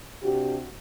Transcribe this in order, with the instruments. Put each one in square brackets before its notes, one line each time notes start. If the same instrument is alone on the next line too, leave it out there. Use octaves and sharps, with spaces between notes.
[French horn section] C3 D4 F#4 G4